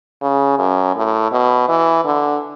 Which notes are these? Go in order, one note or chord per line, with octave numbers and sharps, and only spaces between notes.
C#3
F#2
A2
B2
E3
D3